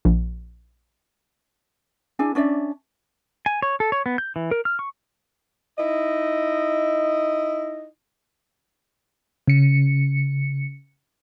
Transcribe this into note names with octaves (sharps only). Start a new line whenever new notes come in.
A#1
D4 E4 G#4 G#5
C#4 D4 D5 E5
G#5
C#5
A4
C#5
B3
G6
E3
A#4
F6
C#6
D#4 E4 D#5
C#3 C#7